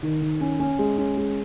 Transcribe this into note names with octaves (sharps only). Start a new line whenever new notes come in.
D#3
D#3
C#4
C#4
G#3
C#4
G#3